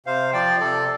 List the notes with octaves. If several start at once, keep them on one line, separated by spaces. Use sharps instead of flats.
C3 C5 F5
F3 D5 G5
C3 A4 D5